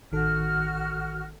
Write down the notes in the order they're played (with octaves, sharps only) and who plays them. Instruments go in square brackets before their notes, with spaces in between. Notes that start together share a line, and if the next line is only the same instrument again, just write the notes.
[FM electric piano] A1 D#3 A4 [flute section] F#4 F6